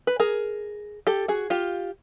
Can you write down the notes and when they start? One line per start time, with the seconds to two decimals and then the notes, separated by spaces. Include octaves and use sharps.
0.07 B4
0.20 G#4 A#4
1.07 G4 A4
1.28 F#4 G#4
1.50 F4 G4